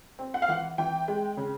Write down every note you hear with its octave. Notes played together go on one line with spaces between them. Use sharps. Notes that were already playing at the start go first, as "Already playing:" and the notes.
C4
F#5
F5
E3 F#5
E3 G5
G#3
C#3